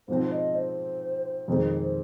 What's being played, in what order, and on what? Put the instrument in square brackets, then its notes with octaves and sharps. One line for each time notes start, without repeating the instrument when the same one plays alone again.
[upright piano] G#2 F3 C4 [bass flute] C5
[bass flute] D#5
C5
[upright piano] F2 D#3 G#3 [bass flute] C5
[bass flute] C5